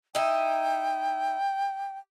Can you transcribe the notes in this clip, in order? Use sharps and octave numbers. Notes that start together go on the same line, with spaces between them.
D#4 E4 G5